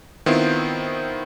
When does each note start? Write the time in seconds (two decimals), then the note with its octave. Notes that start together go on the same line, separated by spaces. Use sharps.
0.26 D#3 B3 C4 E4 F4 C5